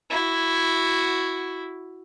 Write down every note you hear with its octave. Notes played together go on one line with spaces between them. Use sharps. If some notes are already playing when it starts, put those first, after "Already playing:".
E4 F#4